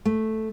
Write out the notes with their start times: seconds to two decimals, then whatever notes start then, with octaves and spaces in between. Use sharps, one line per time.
0.05 A3